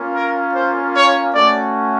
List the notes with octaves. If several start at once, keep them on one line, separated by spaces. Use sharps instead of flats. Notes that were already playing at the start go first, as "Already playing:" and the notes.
Already playing: A#3 C#4 F4
A#4
C5
C#5
A3 C#4 F#4 D5